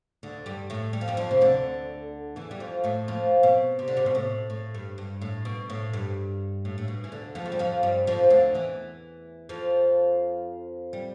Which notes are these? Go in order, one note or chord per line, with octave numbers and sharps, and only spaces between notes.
D2 D3
G2 G3
A2 A3
G3
F3
G2 G3
F2 F3
C3
D2 D3
E2 E3
G3
F2 F3
A2 A3
F2 F3
B2
C3
D3
C3
B2
A2
A2
G2
G2
A2
B2
A2
G2
A2
A2
B2
E3
D2 D3
F2 F3
A3
G3
F2 F3
G2 G3
F2 F3
D2 D3
E2 E3
F2 F3
G3